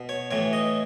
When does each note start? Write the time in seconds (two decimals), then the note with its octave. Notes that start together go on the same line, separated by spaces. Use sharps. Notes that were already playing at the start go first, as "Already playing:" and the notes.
Already playing: B2
0.09 C#5
0.31 A2 E3 C#5
0.53 D#5